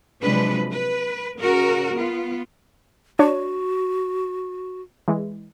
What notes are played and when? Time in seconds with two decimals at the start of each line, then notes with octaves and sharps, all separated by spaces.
0.23 C3 F3 F#3 G#3 D4 B4
0.72 B4
1.41 C#3 F#4 A#4
1.94 B3 F4
3.19 D4 F#4 C#5
5.08 E3 G#3